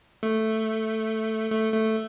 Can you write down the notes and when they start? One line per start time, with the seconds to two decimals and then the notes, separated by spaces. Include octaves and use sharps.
0.23 A3
1.52 A3
1.73 A3